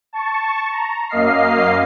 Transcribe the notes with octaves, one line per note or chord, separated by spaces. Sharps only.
A5 C#6
A#5
F#2 A#3 D#5 F5 C7